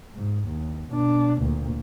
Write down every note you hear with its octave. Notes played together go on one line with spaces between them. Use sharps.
G#2
D#2
B2 D4
D2 A#2